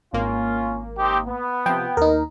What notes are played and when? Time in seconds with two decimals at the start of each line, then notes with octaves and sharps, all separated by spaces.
0.13 G#1 A#3 C#4 F4
0.98 C4 D#4 G4
1.26 B3
1.66 C3 F3 G5
1.97 D#2 D#4 A#4